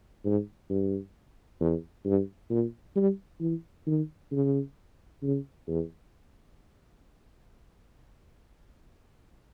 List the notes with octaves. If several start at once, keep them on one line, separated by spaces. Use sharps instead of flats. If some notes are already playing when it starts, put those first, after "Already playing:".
G#2
G2
E2
G2
A#2
G3
E3
D#3
C#3
C#3
E2